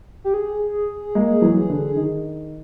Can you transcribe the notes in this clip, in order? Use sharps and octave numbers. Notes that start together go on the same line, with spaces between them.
G4
G#4
G#3 A#3
E3 F#3
D3
D#3